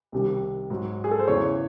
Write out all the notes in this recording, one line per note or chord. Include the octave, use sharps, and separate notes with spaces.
C2 C3 D#3
G#2 F#3
G#4
A4
C5
E2 C#3 E3 C#5